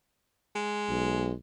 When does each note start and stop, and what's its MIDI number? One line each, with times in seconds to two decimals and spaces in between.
0.55 1.33 56
0.89 1.33 35